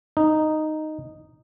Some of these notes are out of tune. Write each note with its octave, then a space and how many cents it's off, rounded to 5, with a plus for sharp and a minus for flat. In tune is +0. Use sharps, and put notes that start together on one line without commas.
D#4 -5